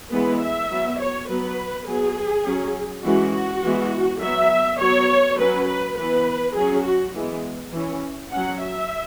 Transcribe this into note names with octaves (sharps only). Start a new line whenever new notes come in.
E3 G#3 B3 B4
E5
F#3 B3
C#5
F#3 B3 B4
F#3 B3 G#4
F#3 C#4
E3 G#3 C#4 F#4
F#4
E3 G#3 B3
F#3 B3 E5
F#3 B3 C#5
F#3 C#4 B4
B4
E3 B3 B4
F#3 C#4 G#4
F#4
E3 G#3 B3
E3 C#4
F#3 C#4 F#5
E5